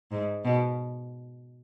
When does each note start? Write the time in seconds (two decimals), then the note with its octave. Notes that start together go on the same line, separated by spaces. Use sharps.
0.11 G#2
0.45 B2